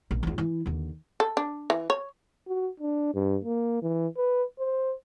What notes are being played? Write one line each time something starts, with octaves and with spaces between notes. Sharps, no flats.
A#1
E2 F4
E3 E4
D#2 D3
A4
D4
E3
C#5
F#4
D4
G2
A#3
E3
B4
C5